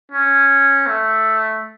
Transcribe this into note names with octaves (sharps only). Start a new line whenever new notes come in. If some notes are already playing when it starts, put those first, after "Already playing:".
C#4
A3